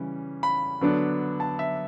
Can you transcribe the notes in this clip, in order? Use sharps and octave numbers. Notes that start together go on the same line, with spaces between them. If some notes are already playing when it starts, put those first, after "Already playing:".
Already playing: C#3 E3 G3 C#4
B5
D3 F#3 B3 D4
A5
E5